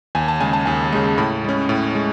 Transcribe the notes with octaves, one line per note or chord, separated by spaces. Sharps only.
D#2 G#5
A5
C#3 G#3 G#5
A5
D#2 G#5
C#3 G#3
A2 B5
G#3 C#4
A2
G#3